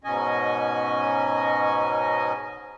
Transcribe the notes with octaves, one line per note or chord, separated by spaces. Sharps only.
G#2 B2 C#4 D#5 G#5